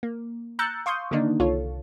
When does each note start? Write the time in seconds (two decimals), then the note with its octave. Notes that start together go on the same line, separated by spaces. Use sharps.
0.03 A#3
0.59 A#5 E6 F#6 G6 A6 C#7
0.86 F5 C6 C#6 D#6 G6
1.11 D3 D#3 A#3 D4 D#4
1.40 C2 F4 A4 C#5